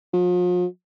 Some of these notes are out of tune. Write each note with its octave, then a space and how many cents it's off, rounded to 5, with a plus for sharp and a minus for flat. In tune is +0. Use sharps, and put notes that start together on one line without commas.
F3 +40